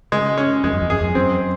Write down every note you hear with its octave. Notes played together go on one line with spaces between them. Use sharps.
C#3 G#3
C#4
F2 G#3
F#2
F2
F#2 G#4
F2
F#2 C4